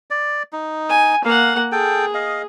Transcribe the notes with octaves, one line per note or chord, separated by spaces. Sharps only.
D5
D#4
G#5
A#3 F5 F#5
G#4 A4 G5
D#5 F5